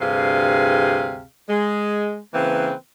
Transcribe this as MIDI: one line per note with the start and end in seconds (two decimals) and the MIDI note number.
0.01 1.23 38
0.01 1.23 43
0.01 1.23 48
0.01 1.23 68
0.01 1.23 77
1.49 2.19 56
2.34 2.72 49
2.34 2.72 52
2.34 2.72 58
2.34 2.72 60
2.34 2.72 71